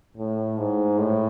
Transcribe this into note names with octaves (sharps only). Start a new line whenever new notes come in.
A2
G#2
A2